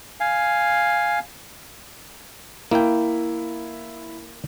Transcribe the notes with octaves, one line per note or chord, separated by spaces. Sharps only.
F5 G#5
A#3 E4 G5